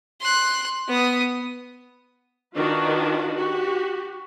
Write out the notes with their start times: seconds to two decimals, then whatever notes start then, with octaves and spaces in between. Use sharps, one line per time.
0.21 C6 F#6
0.87 B3 D#6
2.57 D#3 D4 F4 F#4 B4
3.34 F#4 G4